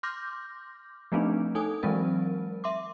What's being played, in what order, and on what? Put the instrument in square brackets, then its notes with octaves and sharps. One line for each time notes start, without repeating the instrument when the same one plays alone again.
[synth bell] C6 D6 F6 G6 A#6
F3 A3 B3 C4 D4 D#4
D#4 A4 G#5 D#6
E3 F#3 G#3 C4 A#4
E5 C6 D6